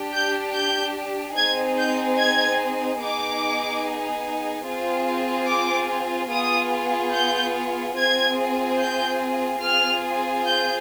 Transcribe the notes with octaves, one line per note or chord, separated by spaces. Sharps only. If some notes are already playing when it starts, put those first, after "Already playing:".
Already playing: D4 G4
G6
G6
C4 D#4 G#4 G#6
G6
G#6
B3 D#4 G#4 D6
C4 F4 G#4
D6
B3 F4 G#4 D#6
G6
C4 F4 G#4 G#6
G6
C4 F4 G#4 F6
G6